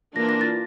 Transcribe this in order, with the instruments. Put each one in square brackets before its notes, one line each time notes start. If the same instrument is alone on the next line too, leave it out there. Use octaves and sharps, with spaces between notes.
[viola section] E3 A#3 D4 F4 [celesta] A#6
[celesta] A#6
A6